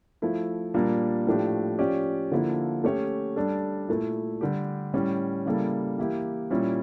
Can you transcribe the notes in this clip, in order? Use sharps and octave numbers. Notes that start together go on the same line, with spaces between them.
F3 A3 E4
A#2 G3 A#3 D4
A2 F3 A3 D4 G4
F3 C#4 G4 D5
D3 F3 A#3 E4 A4
A3 C#4 G4 C#5
G3 D4 A4
A#2 A3 E4
D3 G3 D4 G4
A2 G3 C#4 G4
C#3 G3 A#3 E4 A4
E3 A#3 E4 G4
A#2 G3 C#4 E4